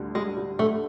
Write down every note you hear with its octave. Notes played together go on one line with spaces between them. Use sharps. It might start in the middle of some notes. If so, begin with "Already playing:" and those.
Already playing: D2 D3 G3
G3 G#3
G3
D3 A3